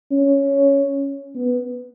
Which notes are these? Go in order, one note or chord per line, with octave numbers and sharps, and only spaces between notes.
C#4
B3